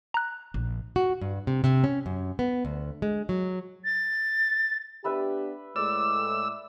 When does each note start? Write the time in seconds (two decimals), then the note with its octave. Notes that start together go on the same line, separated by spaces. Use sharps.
0.14 A#5 F#6
0.54 A#1
0.96 F#4
1.21 G2
1.47 C3
1.64 C3
1.84 C#4
2.06 F#2
2.39 B3
2.65 D2
3.02 G#3
3.29 F#3
3.84 A6
5.04 B3 D4 G4 B4 E5 B5
5.76 A2 G#3 D5 E6